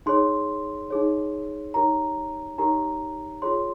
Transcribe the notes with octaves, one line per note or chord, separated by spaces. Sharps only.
D#4 G#4 C#5 C6
D#4 G#4 C#5
D#4 G4 A#4 C#5 A#5
D#4 G4 A#4 C#5 A#5
F4 G#4 C#5 C6